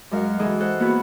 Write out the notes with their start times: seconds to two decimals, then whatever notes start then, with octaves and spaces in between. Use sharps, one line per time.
0.11 F#2 G#3 A#4 F5 F#5
0.39 E3 G#3 D#4 G#4 A4
0.60 A4 C5 F#5
0.80 A#3 B3 E4 F#4 G#4 B4